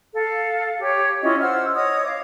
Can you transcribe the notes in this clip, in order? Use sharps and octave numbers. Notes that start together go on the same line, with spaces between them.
A4 F5
G4 C#5
C#4 E4 F4 D#5
C5 F#5 E6 F6
C#5 D#5 D#6
F5 D6